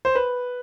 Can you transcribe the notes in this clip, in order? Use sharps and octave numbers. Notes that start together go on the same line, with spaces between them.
C5
B4